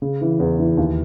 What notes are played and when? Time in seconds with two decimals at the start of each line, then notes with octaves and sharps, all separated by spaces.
0.02 C#3
0.21 E3
0.40 E2
0.59 E3
0.77 D#2